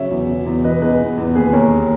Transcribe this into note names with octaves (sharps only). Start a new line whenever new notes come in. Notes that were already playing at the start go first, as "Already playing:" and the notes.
Already playing: C#3 F#3 C#5 E5
E2
B2
E2
E3 B4 D#5
E2 G#4 B4
E2
E2
D#2 G#4 B4
D#2 A#4 C#5